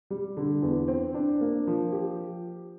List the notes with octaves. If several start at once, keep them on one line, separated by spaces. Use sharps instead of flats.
G3
D3
E2
C4
D4
A#3
F3
G4